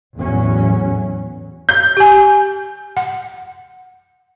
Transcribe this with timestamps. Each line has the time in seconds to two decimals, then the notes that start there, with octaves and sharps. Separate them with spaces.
0.16 E2 A2 F#3 C#4
1.69 G6
1.97 G4 G#5
2.97 F#5